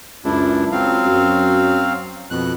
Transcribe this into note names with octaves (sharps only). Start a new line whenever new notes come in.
C#2 F#2 D4 E4
C#2 F#3 C4 F5
F#2
F2 B2 F#6